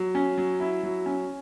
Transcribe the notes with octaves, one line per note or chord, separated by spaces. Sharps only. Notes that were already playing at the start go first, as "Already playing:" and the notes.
Already playing: F#3
C#4
F#3
E4
F#3
C#4